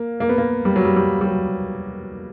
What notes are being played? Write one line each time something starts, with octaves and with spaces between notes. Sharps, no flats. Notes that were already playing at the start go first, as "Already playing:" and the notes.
Already playing: A#3
A#3
B3
A#3
G3
F#3
G3
G3
G3
F#3